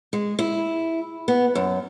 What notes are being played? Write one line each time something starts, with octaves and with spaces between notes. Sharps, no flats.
G#3
E4
B3
F#2